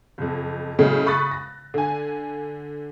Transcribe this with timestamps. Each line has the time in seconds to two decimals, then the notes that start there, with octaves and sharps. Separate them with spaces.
0.18 F#1 F2
0.79 A2 C#3 F#3 G#3 A3
1.06 B5 C#6 D#6 F#6 A6
1.31 A#6
1.74 D3 G#5